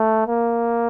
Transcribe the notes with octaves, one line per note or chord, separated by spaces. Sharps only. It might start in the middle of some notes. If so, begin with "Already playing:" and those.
Already playing: A3
A#3